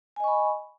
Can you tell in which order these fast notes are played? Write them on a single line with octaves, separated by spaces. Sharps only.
G#5 D#5 C#6 B5